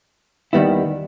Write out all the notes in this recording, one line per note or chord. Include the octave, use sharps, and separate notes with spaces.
D#2 D#3 G3 B3 E4